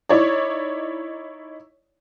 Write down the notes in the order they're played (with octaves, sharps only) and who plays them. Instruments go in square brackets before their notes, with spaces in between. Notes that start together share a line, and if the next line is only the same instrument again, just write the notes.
[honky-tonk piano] D#4 E4 C#5 D5